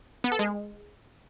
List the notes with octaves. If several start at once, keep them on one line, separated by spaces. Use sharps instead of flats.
B3
A4
G#3